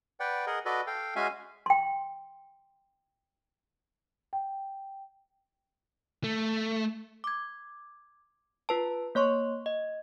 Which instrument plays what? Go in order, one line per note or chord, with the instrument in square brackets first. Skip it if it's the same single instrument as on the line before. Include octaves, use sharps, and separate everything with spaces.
[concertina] B4 D5 F#5 G5
G#4 A#4 D#5 F#5
F#4 A4 B4 D5 D#5
A4 F5 G5
G#3 C#4 F#4 E5 F5 G#5
[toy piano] G5 C6
[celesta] G5
[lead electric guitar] A3
[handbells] D6 G#6
F4 B4 A5
A#3 C#5 C6 C#6
D#5